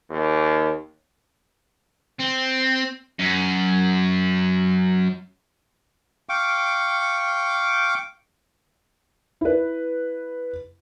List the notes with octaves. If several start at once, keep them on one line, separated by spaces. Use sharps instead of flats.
D#2
C4
F#2
F5 G5 C#6 D6
E4 B4